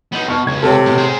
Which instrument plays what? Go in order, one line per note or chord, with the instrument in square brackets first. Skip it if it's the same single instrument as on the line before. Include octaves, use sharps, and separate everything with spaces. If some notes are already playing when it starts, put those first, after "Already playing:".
[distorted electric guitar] B3 D#4
[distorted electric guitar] B2 [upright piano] C#6 F6
[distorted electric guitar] C#2 [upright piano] G#6
[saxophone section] C3 [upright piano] A4 C#5
[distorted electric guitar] G#2 B2
G#4 C5